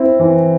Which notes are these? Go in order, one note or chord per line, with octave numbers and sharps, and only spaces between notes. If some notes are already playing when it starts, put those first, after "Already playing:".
Already playing: C4 E4
E3